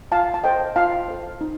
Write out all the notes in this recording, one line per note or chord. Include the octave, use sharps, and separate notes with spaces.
F4 F5 A5
A5
A4 C5 D#5 G5
F4 F5 A5
A4 C5
D#4